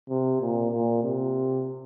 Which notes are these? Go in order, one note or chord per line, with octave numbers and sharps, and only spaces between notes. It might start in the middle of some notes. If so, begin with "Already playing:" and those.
C3
A#2
A#2
C3